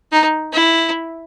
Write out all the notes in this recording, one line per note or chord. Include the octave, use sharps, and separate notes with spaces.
D#4
E4